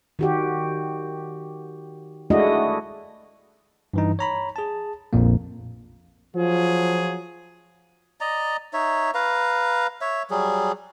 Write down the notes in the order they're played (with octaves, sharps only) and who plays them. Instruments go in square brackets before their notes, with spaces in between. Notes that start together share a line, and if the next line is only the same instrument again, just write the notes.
[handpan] D#3 F#4 G4
G#3 A3 D4 E4 F#4 D#5
[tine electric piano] G2 E3 D#4
C#5 A#5 B5
G#4 A5
A#1 F2 A#2 A#3
[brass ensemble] F3 F#3 F4 G#4
[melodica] D5 D#5 A#5
D#4 C#5 E5
B4 F5 A#5
C#5 E5
F#3 G3 G#4